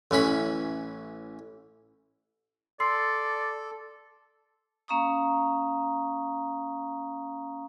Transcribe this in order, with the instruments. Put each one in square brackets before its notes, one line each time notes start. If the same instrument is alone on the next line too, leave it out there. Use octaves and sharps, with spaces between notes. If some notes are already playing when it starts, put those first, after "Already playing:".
[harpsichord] A1 E3 C#4 B5
[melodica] A4 [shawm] D5 [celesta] C6 E6 C7
[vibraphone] A#3 C#4 F5 A#5 C#6 D#6